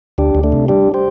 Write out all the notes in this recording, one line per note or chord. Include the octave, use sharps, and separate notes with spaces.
D2 D4 G4
D2
A3 D4
C3
G3 D4 G4
G4 C5